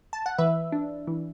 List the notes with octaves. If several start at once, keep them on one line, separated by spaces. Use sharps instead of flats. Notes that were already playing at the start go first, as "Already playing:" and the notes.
A5
F#5
E3 B4 E5
D4
E3